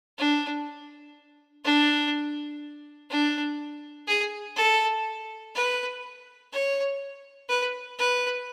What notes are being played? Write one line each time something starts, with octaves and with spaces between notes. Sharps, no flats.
D4
D4
D4
G#4
A4
B4
C#5
B4
B4